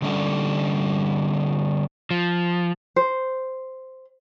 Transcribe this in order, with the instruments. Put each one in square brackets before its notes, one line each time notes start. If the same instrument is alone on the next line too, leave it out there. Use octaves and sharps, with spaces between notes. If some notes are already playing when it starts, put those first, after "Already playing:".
[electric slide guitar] D3 G3 C#4 D4 A4
F3
[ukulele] C5